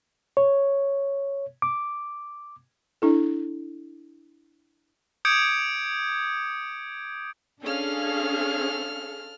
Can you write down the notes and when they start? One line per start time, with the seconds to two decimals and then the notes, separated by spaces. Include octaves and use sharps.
0.37 C#5
1.62 D6
3.02 D4 E4 A4
5.25 D6 D#6 G6 G#6 C#7 D7
7.62 C#4 D4 G#4 A4 F5 F6